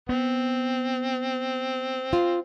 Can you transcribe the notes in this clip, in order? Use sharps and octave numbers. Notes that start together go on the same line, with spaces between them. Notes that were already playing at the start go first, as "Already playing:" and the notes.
B3 C4
F4